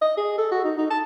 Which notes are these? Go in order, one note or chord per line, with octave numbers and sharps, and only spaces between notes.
D#5
G#4
A4
F#4
D#4
D#4
A5